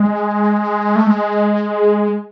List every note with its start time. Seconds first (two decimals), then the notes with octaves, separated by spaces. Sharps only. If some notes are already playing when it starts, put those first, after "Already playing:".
Already playing: G#3
0.96 A3
1.07 G#3